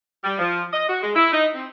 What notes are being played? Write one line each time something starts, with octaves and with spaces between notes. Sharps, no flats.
G3
F3
D#5
F#4
G#3
E4
D#4
C4